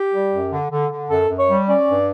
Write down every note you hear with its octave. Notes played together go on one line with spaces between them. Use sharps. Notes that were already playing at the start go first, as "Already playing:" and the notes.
Already playing: G4
G3
F#2
D3
D3
D3
F#2 A4
F#2
C#5
G3
C#4 D5
G2